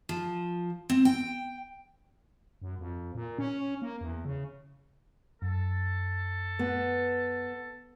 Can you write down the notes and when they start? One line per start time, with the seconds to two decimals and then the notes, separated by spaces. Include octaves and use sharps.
0.09 F3
0.90 C4
1.05 G5
2.62 F#2
2.79 F2
3.15 A#2
3.38 C#4
3.82 A#3
4.01 E2
4.25 C#3
5.42 F#2 A4
6.59 B3